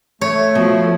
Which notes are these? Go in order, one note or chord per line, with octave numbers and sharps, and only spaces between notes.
A3 C#5
B2 F3